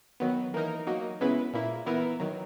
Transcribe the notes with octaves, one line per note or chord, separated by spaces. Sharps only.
D#3 F#3 B3
E3 A#3 D#4 A#4
F#3 A#3 D#4
C#3 G#3 B3 E4 B4
A#2 A#3 E4
E3 B3 E4 A#4
D#3 F#3